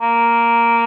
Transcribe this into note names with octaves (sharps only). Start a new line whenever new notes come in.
A#3